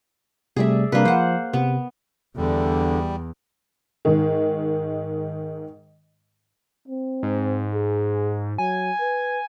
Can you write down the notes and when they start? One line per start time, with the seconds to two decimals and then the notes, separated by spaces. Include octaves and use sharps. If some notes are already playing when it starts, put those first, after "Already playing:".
0.56 C3 G3 A3 G#4 D5 E5
0.92 C3 G3 A#3 D4 B4
1.05 F3 C5 F#5
1.53 C3 B3
2.37 E2 D3 G3
4.05 G#2 D#3
6.88 C4
7.23 G#2
7.74 G#4
8.58 F#3 G#5
9.00 B4